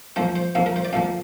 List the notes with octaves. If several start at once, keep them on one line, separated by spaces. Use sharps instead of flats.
F2 F3 A#3 C5
C5
F2 F3 A#3 F5
A#4
C5
D5
F2 F3 A#3 F5